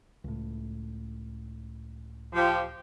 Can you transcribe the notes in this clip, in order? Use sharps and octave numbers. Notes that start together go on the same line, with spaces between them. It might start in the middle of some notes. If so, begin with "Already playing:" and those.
C#2 A2
F3 G4